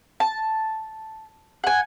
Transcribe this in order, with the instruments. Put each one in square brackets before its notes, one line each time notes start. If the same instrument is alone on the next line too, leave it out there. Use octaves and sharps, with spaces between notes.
[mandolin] A5
F#5 G#5